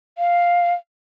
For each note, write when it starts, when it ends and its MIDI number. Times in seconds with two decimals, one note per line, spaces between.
0.18 0.73 77